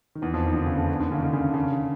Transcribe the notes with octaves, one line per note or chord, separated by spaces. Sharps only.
D#3
E2 E3
F2 F3
D#2 D#3
D3
C#3
D3
D#2 D#3
D3
C#3
D#3
D3
C#3
D3
C#3
D3